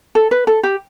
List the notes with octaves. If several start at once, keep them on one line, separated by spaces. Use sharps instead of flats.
A4
B4
A4
G4